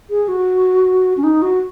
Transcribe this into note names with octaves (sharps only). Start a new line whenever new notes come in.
G#4
F#4
C#4
D#4
F#4